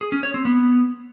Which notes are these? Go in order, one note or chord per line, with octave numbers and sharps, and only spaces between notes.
G#4
C#4
C#5
C4
B3